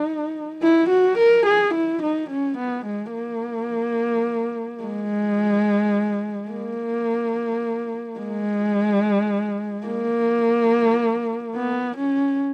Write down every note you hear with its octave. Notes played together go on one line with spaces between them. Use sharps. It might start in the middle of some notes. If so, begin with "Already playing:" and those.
Already playing: D#4
E4
F#4
A#4
G#4
E4
D#4
C#4
B3
G#3
A#3
G#3
A#3
G#3
A#3
B3
C#4